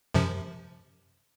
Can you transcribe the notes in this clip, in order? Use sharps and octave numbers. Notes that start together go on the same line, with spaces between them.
F#2 C3 F3